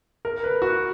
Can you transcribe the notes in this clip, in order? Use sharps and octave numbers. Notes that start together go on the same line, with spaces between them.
A#4
B4
F#4